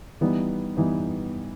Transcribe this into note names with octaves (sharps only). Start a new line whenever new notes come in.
E3 G3 B3 D#4
E3 G3 B3 D#4